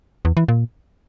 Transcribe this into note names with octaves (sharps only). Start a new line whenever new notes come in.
E2
E3
A#2